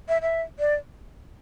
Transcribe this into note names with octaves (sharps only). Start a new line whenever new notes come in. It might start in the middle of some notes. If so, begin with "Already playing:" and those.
E5
E5
D5